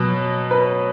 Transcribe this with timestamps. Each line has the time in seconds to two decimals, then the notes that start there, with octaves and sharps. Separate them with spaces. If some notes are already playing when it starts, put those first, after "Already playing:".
Already playing: B2 F#3
0.51 B4